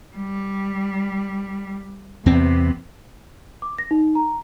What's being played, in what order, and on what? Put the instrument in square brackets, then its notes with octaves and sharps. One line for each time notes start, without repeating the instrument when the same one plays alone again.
[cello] G3
[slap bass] E2 C4 [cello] C3 B3
[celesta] D6
A#6
D#4
A#5